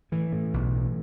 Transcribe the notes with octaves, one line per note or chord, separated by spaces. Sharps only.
A2 E3
A2
B1
A2